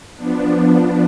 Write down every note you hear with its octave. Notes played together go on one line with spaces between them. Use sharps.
F3 B3 D4